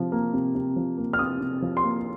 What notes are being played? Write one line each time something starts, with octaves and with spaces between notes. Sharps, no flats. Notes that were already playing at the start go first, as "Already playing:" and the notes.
Already playing: C3 F3
A#3
C3
C3
F3
A#3
F6
C3 D#6
C3
F3
C6
A#3